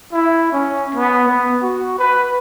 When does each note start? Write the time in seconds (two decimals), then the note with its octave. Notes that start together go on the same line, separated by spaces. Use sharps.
0.12 E4
0.52 C#4
0.95 B3
1.28 B3
1.62 F#4
1.98 B4